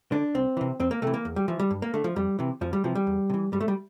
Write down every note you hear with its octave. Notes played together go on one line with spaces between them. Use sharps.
D3 D4
C2 C4
C3 E3
F2 C4
A#3
C3 E3 A3
A#3
E2
G3
E3 F3
G3
G2
A#3
D3 A3
F3
F2 G3
C3 E3
F2 F3
G3
C3 E3 F3
G3
E2
C3
E3
G2 G3
A3
G3